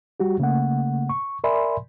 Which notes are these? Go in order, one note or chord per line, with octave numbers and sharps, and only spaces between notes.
G3 F#4 G4
C#3 A3 A#3 F#5
C#6
A#4 D5 E5 G#5 B5 C6